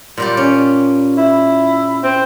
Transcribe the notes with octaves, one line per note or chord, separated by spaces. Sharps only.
A#2 G3 G4
C#4
E4
C4